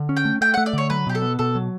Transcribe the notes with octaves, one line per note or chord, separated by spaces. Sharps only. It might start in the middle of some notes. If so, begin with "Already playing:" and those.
Already playing: D3
C#4
G5
A3
A3 G5
F#5
A3
D5
D3 C#5
F#3 B4
B2 G4
A4
B3
B2 A4
F#3